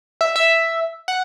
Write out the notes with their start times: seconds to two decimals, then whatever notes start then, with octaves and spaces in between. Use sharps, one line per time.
0.21 E5
0.36 E5
1.08 F#5